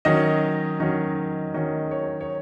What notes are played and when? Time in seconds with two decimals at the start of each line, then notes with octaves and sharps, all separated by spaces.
0.05 D#3 F#3 C#4 D#5
0.80 D#3 F#3 C#4
1.54 D#3 F#3 C#4 D#5
1.91 C#5
2.21 C#5